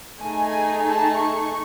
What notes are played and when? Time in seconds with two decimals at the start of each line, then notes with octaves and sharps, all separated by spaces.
0.22 A3 D#4 G#4 G#5
0.88 A5
1.21 C#6